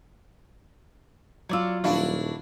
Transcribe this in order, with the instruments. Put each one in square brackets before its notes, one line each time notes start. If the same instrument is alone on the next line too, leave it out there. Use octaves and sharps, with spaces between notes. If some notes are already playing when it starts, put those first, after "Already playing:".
[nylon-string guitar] F#3 F4 [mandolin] C#5 D5 E6
[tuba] D#1 [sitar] D4 E4 F#4 [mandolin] F5